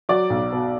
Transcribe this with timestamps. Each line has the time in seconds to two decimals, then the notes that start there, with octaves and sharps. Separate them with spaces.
0.09 F#3 D5
0.30 B1
0.52 B2